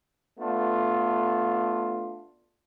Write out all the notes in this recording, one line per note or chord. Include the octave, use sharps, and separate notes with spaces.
A3 B3 D4 F4